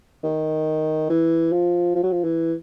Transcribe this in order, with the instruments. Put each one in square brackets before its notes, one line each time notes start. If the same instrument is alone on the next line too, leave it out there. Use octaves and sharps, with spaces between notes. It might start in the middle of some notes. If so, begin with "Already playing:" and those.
[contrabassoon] D#3
E3
F3
F3
F#3
F3
E3